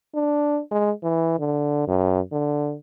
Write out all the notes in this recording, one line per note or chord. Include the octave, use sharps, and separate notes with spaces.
D4
G#3
E3
D3
F#2
D3